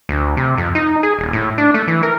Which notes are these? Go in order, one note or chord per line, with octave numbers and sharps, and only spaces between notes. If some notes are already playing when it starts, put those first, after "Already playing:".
D2
C3
F2
D#4
G#4
D#1
A2
D4
A3
E3
A#4